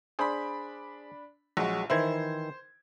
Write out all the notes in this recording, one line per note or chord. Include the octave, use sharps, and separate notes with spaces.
D4 G#4 C5 B5
A#1 F#3 G#3 F#4
D#3 E3 E4 C5 G#6